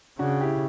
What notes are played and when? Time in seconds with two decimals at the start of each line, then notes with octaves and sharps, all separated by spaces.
0.19 C#3 D4 F#4
0.41 E4 G4